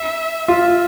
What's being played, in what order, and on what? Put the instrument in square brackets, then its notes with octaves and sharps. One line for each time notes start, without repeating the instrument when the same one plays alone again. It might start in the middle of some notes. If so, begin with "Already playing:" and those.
Already playing: [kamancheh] E5
[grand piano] F4 [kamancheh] E5